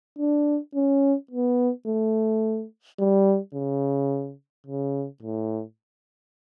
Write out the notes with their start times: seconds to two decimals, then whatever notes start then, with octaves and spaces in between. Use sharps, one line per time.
0.19 D4
0.75 C#4
1.31 B3
1.86 A3
2.99 G3
3.54 C#3
4.66 C#3
5.22 A2